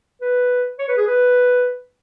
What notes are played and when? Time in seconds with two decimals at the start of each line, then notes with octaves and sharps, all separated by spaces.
0.22 B4
0.79 C#5
0.88 B4
0.97 G#4
1.07 B4